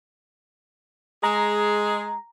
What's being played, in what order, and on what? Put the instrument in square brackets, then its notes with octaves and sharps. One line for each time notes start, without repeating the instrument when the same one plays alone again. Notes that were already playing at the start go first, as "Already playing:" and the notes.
[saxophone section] G#3 G#4 [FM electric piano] A#5